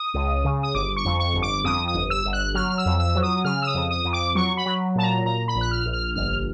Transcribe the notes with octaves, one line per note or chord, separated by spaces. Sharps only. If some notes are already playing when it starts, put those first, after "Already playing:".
Already playing: D#6
C#2
C#3
D#6
G1 D6
C#6
F2
C#6
G1
D6
F2 D#6
D#6
G1
E6
G1
F#6
F#3 F6
F6
E6
F2
E6
F#3
D#6
C#3 F6
E6
D#6
F2
D#6
F2
D6
F#3 C#6
B5
F#3
A#2 A5
A#5
A#2 A#5
B5
A#1
F#6
F6
A#1
F6
G1 F6